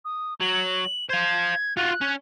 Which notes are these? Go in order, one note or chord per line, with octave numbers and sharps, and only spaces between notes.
D#6
F#3 F#7
C5 F5 G#6
F4 F#4 F#6
C#4